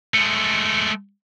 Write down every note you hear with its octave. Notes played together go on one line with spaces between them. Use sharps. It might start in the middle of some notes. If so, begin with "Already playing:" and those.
G#3 A3